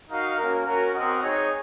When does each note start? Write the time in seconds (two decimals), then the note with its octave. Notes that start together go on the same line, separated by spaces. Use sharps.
0.09 D#4 F#4 A#4 F5
0.38 A#3 C#4 F#4 A#4
0.65 C#4 F#4 A#4
0.94 C4 F#4 A#4 D#5 F#5
1.21 D#4 G#4 C#5